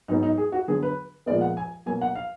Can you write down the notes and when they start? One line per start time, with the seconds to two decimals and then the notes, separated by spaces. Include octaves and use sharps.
0.08 G#2 F#3 B3 D#4
0.23 D#4
0.38 G#4
0.52 F#4
0.68 D3 F#3 B3 G#4
0.83 B4
1.26 A#2 F3 G#3 B3 D5
1.41 F#5
1.57 G#5
1.86 B2 F#3 A#3 G#5
2.01 F#5
2.15 F5